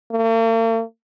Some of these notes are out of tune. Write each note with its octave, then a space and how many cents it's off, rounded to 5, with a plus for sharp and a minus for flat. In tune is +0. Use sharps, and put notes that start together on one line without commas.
A#3 -45